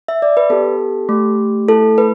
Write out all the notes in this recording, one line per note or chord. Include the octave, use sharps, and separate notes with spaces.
E5
D5
B4
B3 G4 A4
A3 G4
A3 E4 A4
B4